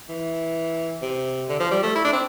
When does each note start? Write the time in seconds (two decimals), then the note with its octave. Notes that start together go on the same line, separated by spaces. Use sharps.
0.09 E3
1.02 C3
1.49 D3
1.60 F3
1.71 G3
1.83 A3
1.96 E4
2.05 D4
2.13 C4